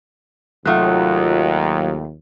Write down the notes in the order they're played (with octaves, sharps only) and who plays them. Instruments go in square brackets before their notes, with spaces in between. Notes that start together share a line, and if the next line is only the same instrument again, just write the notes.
[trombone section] D#2 [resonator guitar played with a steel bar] C3 A3 [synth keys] F#3 F4 [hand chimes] F#5 D#6 F#6